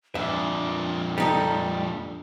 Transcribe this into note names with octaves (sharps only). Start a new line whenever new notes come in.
F2 A#2 D4 E5
G3 D#4 A4